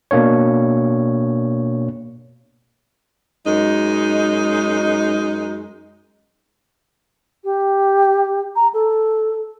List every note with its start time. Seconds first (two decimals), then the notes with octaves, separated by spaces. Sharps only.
0.11 B2 A#3 D4 C#5
3.46 F#2 G#3 D#4
7.44 G4
8.56 A#5
8.74 A4